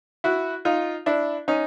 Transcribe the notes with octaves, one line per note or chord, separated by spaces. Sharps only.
E4 F#4
D#4 F4
D4 E4
C#4 D#4